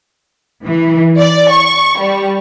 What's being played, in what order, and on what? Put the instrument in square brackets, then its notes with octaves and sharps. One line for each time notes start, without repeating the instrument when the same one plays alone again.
[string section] E3
D5
C#6
G3